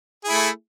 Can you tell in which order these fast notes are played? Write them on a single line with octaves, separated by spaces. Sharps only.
G#4 E4 A3